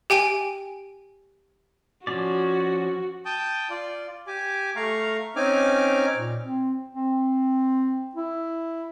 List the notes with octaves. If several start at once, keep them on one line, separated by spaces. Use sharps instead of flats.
G4 G5 G#5 D7
F3 C#4 F#4 D5
G5 A5 D#6 G6
F4 D5
G4 G#5 D6
A3 F5 A#5 C#6
C4 C#4 D#4 G#5 D6 F6
A#2
C4
C4
E4